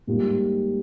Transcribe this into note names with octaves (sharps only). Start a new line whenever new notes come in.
G#2 G3 A#3 F4